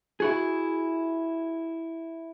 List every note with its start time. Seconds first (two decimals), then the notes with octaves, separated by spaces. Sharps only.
0.20 E4 F#4 G#4